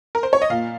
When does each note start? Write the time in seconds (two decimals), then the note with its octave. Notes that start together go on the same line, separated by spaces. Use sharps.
0.15 A#4
0.23 C5
0.33 C#5
0.42 D#5
0.50 A#2 F5